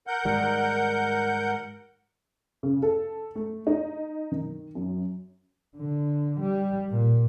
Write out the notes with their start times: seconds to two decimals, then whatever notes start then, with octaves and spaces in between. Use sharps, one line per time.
0.07 A#4 F#5 G6
0.25 G#2 D#3 G3
2.63 C#3
2.82 A4
3.35 A3
3.67 D#4
4.32 D#3
4.75 F#2
5.77 D3
6.40 G3
6.91 A#2